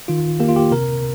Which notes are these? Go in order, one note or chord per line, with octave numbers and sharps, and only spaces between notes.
D#3 F4
A#3 G4
F4
G4
C3 A#4